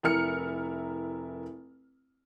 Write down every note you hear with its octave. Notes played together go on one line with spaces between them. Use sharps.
F1 E4 A#4 F6 C#7